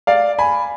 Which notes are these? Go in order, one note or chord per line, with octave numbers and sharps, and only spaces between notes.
D5 F5
G#5 B5